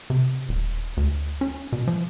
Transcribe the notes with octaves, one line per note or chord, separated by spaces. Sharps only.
C3
D#1
D2
C#4
B2
F3